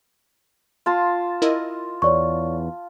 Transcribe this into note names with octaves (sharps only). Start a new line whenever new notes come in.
F4 A5 C6
E4 A#4 D#5
E2 C#5 D5 C#6